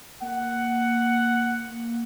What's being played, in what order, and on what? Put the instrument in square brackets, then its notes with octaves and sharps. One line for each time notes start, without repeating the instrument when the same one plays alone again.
[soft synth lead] A#3 [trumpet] F#5